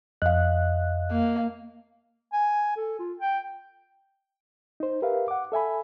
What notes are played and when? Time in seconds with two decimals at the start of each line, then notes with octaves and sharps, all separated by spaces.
0.22 F2 D#5 F5 F#6
1.11 A#3
2.33 G#5
2.77 A4
2.99 F4
3.19 G5
4.80 D#4 C5
5.02 G4 A#4 B4 E5 F5
5.28 F#5 D6
5.52 A4 E5 G#5 B5